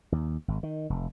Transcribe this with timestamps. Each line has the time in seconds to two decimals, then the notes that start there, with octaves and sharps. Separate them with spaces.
0.12 D#2
0.48 G#1
0.63 D#3
0.90 F1